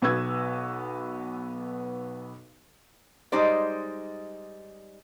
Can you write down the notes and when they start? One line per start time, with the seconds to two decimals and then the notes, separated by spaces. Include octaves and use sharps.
0.02 B1 B3 F#4 B4 E6 G#6
3.32 G3 G#3 D#4 C5 D5